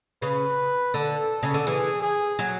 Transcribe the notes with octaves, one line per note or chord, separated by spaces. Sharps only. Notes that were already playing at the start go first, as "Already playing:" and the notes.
C#3 B4
D3 A4
C#3
D3
E3 G#4
G#4
F#3